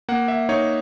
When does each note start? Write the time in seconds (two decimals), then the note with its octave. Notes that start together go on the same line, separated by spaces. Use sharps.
0.08 A#3 F#5
0.28 E5
0.49 D#4 C#5